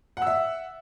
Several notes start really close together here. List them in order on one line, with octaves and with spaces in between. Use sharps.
F#5 E6 E5